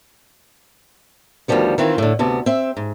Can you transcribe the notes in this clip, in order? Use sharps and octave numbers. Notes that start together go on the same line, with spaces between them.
D2 G#2 D#3 F3 G3 B3
D#3 E3 C4 E4 F4
A2 D3
D2 C3 B3 A5
C4 E5
G#2